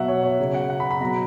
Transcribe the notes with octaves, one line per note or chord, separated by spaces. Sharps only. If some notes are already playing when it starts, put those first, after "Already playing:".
Already playing: B2 F#3 E5 F#5
C#5
C#5
C#3 F#3
F#5
F#5
B5
B5
B2 F#3 A#5